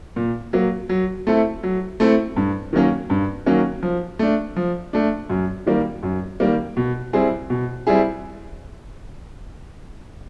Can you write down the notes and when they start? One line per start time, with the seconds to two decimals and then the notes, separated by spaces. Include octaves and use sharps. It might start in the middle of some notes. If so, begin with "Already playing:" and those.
0.16 A#2
0.53 F#3 A#3
0.89 F#3
1.27 A3 C4 E4 A4
1.63 F#3
2.00 A3 C4 E4 A4
2.36 G2
2.73 D#3 F#3 A#3 C#4
3.10 G2
3.46 D#3 F#3 A#3 C#4
3.83 F3
4.19 A3 D4
4.56 F3
4.93 A3 D4
5.30 F#2
5.66 D#3 G3 A#3
6.03 F#2
6.40 D#3 G3 A#3
6.77 B2
7.13 G3 C4 E4 G#4
7.50 B2
7.87 G3 C4 E4 G#4